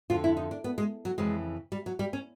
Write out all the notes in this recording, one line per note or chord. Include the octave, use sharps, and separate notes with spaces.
F2 D3 F4
E4
D#4
D4
B3
G#3
F#3
F2 C#3 E3 G#3
G3
F#3
G3
C#4